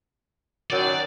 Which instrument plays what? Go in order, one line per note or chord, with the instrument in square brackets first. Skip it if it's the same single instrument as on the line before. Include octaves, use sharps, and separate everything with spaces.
[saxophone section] F#2 D#3 F#3 [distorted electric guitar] D5